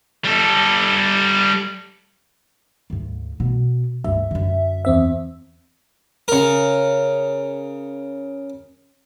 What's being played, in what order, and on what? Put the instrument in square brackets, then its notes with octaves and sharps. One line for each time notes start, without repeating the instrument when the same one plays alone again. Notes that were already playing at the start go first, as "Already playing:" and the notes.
[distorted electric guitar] G3 A4
[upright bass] D2 G#2
B2 B3
[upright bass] C#2 G2 [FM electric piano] E5
[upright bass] F#2 D3
[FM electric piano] E2 C4 E5
[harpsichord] C#3 A#4